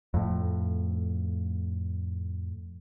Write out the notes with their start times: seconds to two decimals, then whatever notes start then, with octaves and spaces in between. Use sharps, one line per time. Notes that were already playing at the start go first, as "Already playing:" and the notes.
0.14 F2 A2